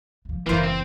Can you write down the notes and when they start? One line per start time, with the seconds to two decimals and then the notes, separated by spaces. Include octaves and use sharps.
0.25 E3 F3
0.46 F#1 E3 A#3 F4 C5
0.63 C4